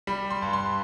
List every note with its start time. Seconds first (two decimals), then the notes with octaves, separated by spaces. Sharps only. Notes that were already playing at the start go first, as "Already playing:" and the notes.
0.07 G3 B5
0.30 C6
0.42 G2
0.53 C6